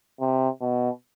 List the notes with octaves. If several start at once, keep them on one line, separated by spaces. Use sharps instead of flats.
C3
B2